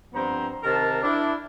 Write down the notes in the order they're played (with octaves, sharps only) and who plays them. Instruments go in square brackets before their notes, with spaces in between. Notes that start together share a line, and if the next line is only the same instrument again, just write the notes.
[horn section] G2 F3 B3 C4 C5 A#5
C3 D#3 A#4 C5 A5
D4 E4